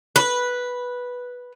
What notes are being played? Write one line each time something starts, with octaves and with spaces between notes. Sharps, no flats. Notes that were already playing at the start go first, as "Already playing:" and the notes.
B4